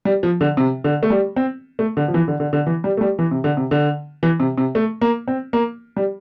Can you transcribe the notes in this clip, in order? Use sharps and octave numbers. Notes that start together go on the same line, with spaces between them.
G3
F3
D3
C3
D3
A3
G3
C4
A3
D3
F3
E3
D3
D3
D3
E3
G3
A3
G3
E3
C3
D3
C3
D3
E3
C3
C3
A3
A#3
C4
A#3
G3